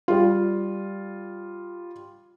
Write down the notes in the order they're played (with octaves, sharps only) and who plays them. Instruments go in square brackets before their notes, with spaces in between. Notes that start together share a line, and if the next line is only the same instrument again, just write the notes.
[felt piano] G3 F4